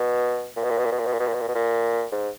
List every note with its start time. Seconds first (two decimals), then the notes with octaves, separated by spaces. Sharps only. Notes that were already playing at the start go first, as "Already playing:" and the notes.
Already playing: B2
0.56 A#2
0.63 B2
0.70 A#2
0.78 B2
0.84 A#2
0.91 B2
0.99 A#2
1.06 B2
1.13 A#2
1.19 B2
1.27 A#2
1.34 B2
1.41 A#2
1.48 B2
1.55 A#2
2.12 G#2